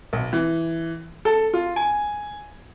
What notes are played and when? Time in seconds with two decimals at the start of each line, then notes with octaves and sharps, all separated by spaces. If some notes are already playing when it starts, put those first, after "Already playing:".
0.13 B1
0.33 E3
1.25 A4
1.54 F4
1.76 G#5